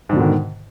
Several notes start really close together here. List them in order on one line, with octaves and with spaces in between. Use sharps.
G#2 D3 B2 D#3